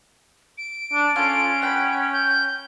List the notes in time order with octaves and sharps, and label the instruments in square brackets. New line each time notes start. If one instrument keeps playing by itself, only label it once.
[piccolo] D7
[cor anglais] D4
[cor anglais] C#4 [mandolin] F4 A4
[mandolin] F#5 G5 B5
[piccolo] G6